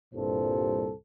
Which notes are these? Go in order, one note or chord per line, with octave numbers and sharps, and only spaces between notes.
C2 G2 A#2 A4 C5